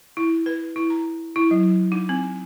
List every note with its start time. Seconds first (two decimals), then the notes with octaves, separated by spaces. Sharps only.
0.17 E4
0.46 B4
0.76 E4
0.90 A#5
1.36 E4
1.51 F#3
1.92 D#4
2.09 C4